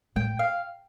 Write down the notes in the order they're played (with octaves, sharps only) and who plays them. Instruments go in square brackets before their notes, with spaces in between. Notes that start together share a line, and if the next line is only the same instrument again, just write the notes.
[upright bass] A2 [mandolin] G5
[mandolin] F5